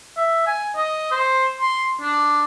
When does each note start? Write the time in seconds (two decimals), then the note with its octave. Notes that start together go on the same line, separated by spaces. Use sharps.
0.17 E5
0.47 G#5
0.76 D#5
1.11 C5
1.61 C6
2.01 D4